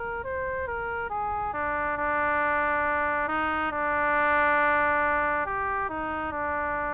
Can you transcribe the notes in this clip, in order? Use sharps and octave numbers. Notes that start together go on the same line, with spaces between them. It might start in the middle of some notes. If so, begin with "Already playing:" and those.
Already playing: A#4
C5
A#4
G#4
D4
D4
D#4
D4
G4
D#4
D4